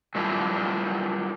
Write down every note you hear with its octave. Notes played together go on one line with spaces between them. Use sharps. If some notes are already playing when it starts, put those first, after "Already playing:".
F#3 G3 D4 E4 F4